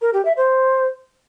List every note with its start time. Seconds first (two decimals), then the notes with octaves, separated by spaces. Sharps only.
0.02 A#4
0.13 G4
0.25 E5
0.37 C5